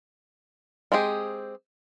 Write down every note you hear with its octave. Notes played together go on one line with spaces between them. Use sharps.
G#3 C4 G4 G#4